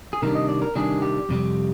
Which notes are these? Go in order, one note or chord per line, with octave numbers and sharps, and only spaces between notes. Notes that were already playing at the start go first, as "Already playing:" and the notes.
G#4
C3 D#3 G3 D4 A#4
D#5
D5
A#4
C3 D#3 G3 D4 G#4
G4
F2 C3 G3